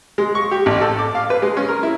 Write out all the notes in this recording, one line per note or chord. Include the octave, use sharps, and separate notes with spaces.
G#3
C#6
G4
A1
A4
D6
F5
B4
G#3
C#4
A#4
E4